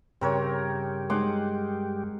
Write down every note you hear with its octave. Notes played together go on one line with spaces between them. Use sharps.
G2 C#3 C4 G4 A#4 C#5
G#3 D#4 G#4 F#5 C6 D6